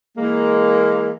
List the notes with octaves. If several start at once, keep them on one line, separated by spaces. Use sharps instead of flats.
E3 G#3 A#3